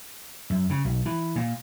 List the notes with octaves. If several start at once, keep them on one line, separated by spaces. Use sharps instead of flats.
F#2
C#3
B1
E3
A#2